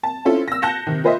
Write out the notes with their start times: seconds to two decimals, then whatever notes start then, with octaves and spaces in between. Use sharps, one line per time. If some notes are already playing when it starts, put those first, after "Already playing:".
0.03 A5
0.25 C4 C#4 E4 F4 A4
0.48 E6 A#6
0.62 A5 F#6 G6 A#6 C#7 E7
0.87 C3 D#3
1.04 F4 B4 C5 D#5 E5